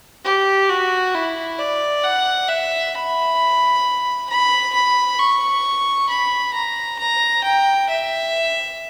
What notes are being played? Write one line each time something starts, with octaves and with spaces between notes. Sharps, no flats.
G4
F#4
E4
D5
F#5
E5
B5
B5
B5
C#6
B5
A#5
A#5
G5
E5